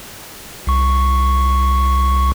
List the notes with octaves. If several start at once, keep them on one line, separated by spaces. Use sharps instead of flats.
C2 C#6